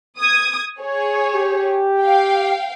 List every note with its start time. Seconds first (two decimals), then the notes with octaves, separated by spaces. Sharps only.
0.18 D#6 G#6
0.80 G#4 C#5
1.34 G4
2.00 F5 G5